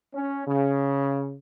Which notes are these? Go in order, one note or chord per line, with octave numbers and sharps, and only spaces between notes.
C#4
C#3